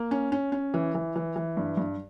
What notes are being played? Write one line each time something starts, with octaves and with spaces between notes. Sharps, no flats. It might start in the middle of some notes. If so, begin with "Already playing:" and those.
Already playing: A#3
C#4
C#4
C#4
E3
E3
E3
E3
G2
G2